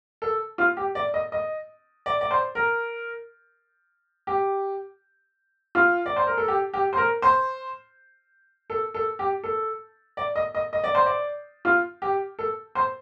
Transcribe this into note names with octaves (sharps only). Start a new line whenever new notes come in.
A4
F4
G4
D5
D#5
D#5
D5
D5
C5
A#4
G4
F4
D5
C5
A#4
A4
G4
G4
C5
A#4
C5
A4
A4
G4
A4
D5
D#5
D#5
D#5
D5
C5
D5
F4
G4
A4
C5